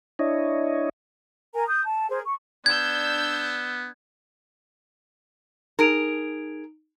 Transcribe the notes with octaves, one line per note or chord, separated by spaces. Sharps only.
D4 E4 C#5 D#5
A#4 G#5 A#5
D#6 G6
A5
G#4 A#4 C5
C#6
B3 D4 E6 G6 G#6
D#4 G#4 A#4 D7 F7